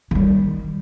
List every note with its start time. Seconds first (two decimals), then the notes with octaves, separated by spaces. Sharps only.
0.11 D#3 G3